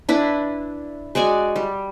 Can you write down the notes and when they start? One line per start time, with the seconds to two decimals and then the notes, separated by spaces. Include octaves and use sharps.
0.09 D4 E4 B4
1.15 G#3 F#4 D5 G#5
1.56 G3